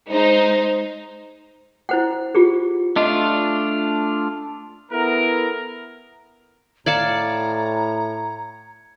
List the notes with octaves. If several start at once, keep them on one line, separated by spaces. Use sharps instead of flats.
G#3 D#4 C5
E4 C5 F#5
F4 G4 G#4
A3 D4 F4 D#5
B3 E4 A4 A#4
A2 D5 F5 A5 A#5 G#6 C#7